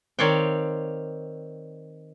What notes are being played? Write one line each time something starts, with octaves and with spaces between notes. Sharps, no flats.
D#3 C4 C#5 D5 F5 G5